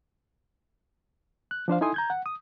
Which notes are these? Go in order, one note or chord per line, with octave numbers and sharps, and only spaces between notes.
F#6
F3 D4 C5 F5
D#4 E4 A4 G#5 C6 D#6
A#5 G6 G#6
F#5
D#6